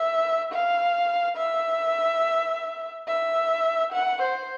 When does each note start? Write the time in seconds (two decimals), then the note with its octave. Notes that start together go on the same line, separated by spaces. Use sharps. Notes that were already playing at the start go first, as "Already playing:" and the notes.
Already playing: E5
0.52 F5
1.37 E5
3.08 E5
3.93 F#5
4.22 C5